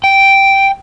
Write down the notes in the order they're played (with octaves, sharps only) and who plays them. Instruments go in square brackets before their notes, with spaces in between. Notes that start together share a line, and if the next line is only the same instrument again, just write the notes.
[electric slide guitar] G5 [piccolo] D7